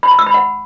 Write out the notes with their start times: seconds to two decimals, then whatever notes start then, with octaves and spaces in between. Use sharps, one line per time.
0.03 B5
0.11 A#5
0.19 E6
0.26 B5
0.34 F#5